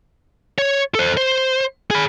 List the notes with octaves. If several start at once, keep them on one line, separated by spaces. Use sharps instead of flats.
C#5
A4 C5
C5
G#4 B5